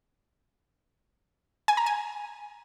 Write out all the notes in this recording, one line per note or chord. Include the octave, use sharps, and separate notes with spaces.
G#5
A#5
G#5